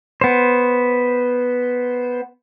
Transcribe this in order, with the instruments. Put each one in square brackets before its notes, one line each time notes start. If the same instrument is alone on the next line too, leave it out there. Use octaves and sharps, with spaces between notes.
[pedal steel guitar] B3 C5